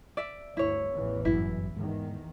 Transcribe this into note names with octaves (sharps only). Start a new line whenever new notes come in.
D5 E5
G1 D2 E4 C#5
A1 E2 E3
G1 F#2 E4
E2 G#2 D#3